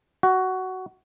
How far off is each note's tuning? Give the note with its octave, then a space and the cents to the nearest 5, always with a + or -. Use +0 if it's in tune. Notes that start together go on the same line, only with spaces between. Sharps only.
F#4 +15